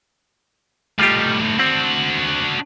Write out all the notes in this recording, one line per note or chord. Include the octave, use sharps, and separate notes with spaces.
A2 G3 D#4 F4 G4
C4 D4 F#4